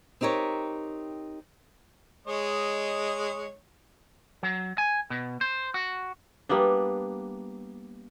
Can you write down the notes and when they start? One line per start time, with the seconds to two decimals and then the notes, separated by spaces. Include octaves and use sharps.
0.21 C4 D#4 G4 A#4 C#5
2.27 G#3 C#5 D#5
4.43 F#3
4.78 G#5
5.10 B2
5.41 C5
5.74 F#4
6.49 G3 A#3 B3 D4